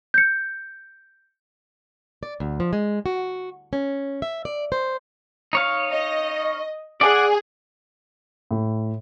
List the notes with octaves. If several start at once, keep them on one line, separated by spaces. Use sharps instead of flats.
G6 C#7
D5
D2
F3
G#3
F#4
C#4
E5
D5
C5
D#4 C#5 F5
D#5
G#4 D5 F#5
A2